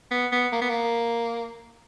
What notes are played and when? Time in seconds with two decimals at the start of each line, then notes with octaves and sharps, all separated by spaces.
0.11 B3
0.32 B3
0.52 A#3
0.61 B3
0.69 A#3